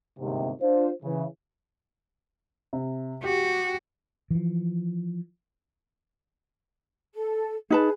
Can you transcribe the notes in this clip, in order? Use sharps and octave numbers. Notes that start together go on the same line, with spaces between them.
G1 D#2 G#2 C3
D4 F4 C5
C#3 E3
C3
F#4 G4 G5
E3 F3
A4
D#4 G#4 B4 A5